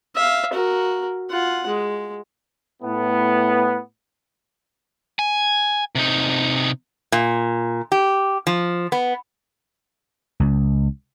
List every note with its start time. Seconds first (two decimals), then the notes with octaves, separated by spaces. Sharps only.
0.16 E5 F5
0.53 F#4 A#4
1.30 F4 F#5
1.67 G#3
2.83 A2 B3
5.19 G#5
5.95 C3 D#4
7.12 A#2
7.92 G4
8.47 F3
8.92 B3
10.40 C#2